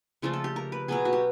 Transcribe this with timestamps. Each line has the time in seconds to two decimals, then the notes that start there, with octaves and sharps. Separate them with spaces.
0.22 C#3 F3 A3 D4 F4
0.33 A4
0.44 G4
0.56 A#4
0.72 B4
0.88 B2 F#3 B3 G#4
1.05 F#4
1.13 G4